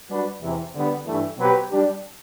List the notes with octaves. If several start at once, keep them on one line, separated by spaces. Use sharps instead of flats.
G3 D4 F#4 B4
E2 C3 E3
D3 G3 B3
G2 E3 A3
B2 F#3 C4 G4 B4
G3 D4 G4